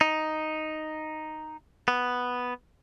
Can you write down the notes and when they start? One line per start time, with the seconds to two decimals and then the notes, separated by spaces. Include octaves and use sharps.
0.01 D#4
1.88 B3